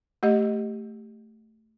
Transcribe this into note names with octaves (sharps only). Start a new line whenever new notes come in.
A3 G4 D#5